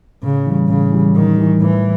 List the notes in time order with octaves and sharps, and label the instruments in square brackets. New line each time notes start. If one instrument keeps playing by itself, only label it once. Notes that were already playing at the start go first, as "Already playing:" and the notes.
[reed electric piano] A2 [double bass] C#3
[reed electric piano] E3 G3
[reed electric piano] A2 [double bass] C#3
[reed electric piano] E3 G3
[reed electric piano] A2 [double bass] D#3
[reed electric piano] E3 G3
[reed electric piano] A2 [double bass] E3